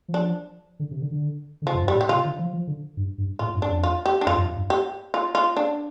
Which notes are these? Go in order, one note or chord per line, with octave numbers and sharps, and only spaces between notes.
F3
D4
D3
C3
D3
D3
D3
C3 F3
F2
G2
G3
A2
G4
C3 F4
D3
F3
F3
D3
G2
G2
A2 F4
G2
D4
F2
F4
G4
D4
F2 F4
G2
F2
G2
G4
F4
F4
D4